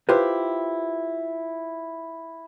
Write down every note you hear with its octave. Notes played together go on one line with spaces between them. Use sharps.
E4 F4 G4 B4 C5